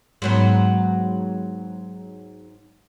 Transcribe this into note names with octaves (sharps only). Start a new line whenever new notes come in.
G#2 F#3 B3